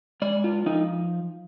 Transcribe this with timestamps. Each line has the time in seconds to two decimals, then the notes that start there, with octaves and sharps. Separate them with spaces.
0.22 G#3 D5
0.44 F4
0.66 F3 D#4